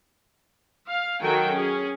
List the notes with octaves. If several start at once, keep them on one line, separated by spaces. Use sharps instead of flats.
F5
D#3 F#3 F#4 A4 G5 G#5
C#4 G#4